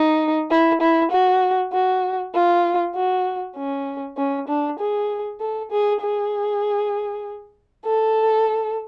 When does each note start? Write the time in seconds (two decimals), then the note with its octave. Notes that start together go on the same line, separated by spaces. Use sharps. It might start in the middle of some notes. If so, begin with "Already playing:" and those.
Already playing: D#4
0.51 E4
0.81 E4
1.11 F#4
1.73 F#4
2.35 F4
2.95 F#4
3.57 C#4
4.17 C#4
4.48 D4
4.79 G#4
5.41 A4
5.71 G#4
6.01 G#4
7.86 A4